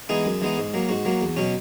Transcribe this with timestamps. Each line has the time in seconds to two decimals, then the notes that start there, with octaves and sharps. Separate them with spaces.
0.09 E3 G#3 B3 D#4 G#4
0.25 F#2
0.41 E3 G#3 B3 D#4
0.57 G#2
0.74 F#3 A#3
0.89 G#2 F#4
1.05 F#3 A#3
1.21 E2
1.36 B2 F#3 C#4